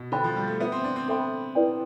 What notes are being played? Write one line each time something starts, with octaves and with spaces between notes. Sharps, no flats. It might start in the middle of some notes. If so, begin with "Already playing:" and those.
Already playing: B2
D3 C5 G5 B5
F3
G3
A3
B3 F4 C5 E5
C4
D4
C4
C4 A4 E5 G5 B5
E4 B4 D5 G5